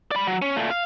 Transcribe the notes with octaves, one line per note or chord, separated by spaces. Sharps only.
D5 B5
F#3
C#4
A#2 A3
F5